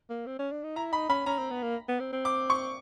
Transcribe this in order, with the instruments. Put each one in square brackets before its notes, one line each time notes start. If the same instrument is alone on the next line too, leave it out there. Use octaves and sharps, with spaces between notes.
[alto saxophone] A#3
C4
C#4
D4
D#4
[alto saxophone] E4 [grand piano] A#5
[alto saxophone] D#4 [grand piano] B5
[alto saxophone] C#4 [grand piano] B5
[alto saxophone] C#4 [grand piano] A#5
[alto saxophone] C4
B3
A#3
B3
C4
C4
[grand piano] D6
C#6